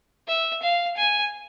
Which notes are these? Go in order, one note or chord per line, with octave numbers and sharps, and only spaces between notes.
E5
F5
G#5